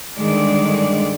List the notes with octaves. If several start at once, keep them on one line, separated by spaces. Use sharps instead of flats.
G2 D3 D#3 G#3 D5